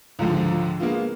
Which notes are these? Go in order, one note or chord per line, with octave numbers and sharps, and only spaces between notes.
C#2 G#2 D3 F3
G#3 A#3 B3 F4